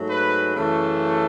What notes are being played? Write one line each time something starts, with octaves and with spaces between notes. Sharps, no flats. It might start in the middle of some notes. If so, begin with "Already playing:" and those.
Already playing: G#2 F#3 A3
B4
F#2 C#3 E3 A3